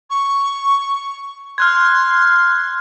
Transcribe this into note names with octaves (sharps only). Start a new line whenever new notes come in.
C#6
C6 F6 F#6 G#6